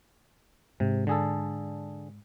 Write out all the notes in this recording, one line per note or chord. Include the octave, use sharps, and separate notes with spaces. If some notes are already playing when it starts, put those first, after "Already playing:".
G#2 C3
D3 G#4 A4